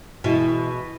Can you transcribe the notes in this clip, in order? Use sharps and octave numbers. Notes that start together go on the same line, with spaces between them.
B2 E3 G#3 E4